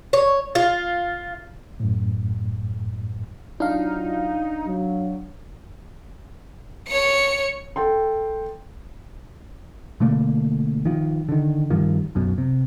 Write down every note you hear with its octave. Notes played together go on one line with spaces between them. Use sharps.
C#5
F4
F#2 A2
F#3 D4 D#4 F4 F5
F#3
C#5 C#7
A4 G5 C6
B2 D3 A3 A#3
D#3 F3
D3 D#3
G2 D#3 F3
B1 F#2 B2
C3